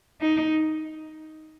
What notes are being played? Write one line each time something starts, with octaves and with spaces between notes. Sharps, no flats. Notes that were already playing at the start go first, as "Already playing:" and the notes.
D#4